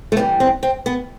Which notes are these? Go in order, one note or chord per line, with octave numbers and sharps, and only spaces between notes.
A3
G2 E3 G3 B3
C4
C4
B3